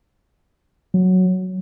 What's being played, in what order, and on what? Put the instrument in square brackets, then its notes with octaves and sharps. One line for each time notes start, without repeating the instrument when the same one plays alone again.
[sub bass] F#3